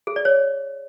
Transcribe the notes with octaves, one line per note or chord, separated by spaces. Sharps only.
G#4
D5
C#5